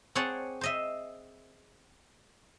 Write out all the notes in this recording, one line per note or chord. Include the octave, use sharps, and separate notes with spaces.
C4 G#4 C#5 D5 F#5 A5
C5 D#5 E5